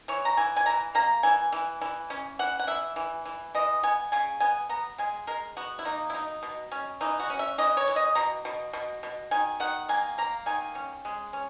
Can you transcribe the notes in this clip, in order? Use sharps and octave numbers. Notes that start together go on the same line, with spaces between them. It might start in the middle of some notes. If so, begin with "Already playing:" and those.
E3 C#5
A#5
E3 G#5
G#5
E3 A#5
A#3 A#5
E3 G#5
E3
E3
C#4
E3 F#5
F#5
E3 E5
E3
E3
E3 D#5
B3 G#5
C#3 G#5
B3 G#5
B3 A#5
G#3 G#5
G#3 A#4
B3 F#4
E4
A#3 D#4
E4
B2 D#4
B2
C#4
E3 D#4
F#4
C#4
E5
E3 D#5
C#5
E3
D#5
B2 A#5
B2
B2
B2
D#3 G#5
D#3 F#5
A#3 G#5
A#3 A#5
D#3 G#5
C#4
G#3
C#4